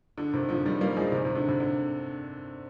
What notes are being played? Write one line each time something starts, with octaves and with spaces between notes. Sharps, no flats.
D3
C3 D#3
D3 F3
D#3 G3
G3 A#3
F3 G#3
C3 D#3
C3
D3
C3
D3